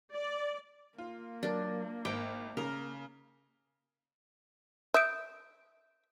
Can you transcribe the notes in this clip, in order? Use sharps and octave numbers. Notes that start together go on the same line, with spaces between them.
D5
A#3 F4
F#3 D4 A#4
G#1 G5 D6
C#3 A#4
E5 D#6 G6 D7